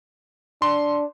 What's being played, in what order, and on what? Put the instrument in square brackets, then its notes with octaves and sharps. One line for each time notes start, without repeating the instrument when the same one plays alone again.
[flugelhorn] D4 [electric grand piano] C6